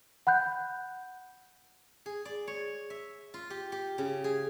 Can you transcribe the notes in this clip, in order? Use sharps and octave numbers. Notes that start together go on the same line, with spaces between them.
F#5 B5 F#6 G6
G#4
D5
C#5
E5
F4
G4
G4
C#3
G#4